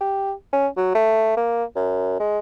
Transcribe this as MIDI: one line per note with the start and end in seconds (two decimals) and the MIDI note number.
0.01 0.32 67
0.53 0.67 61
0.77 0.94 54
0.95 1.36 57
1.37 1.64 58
1.76 2.16 42
2.20 2.39 56